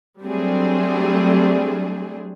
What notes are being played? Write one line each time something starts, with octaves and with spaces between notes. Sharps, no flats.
F#3 G3 A3 C4 D4 G#4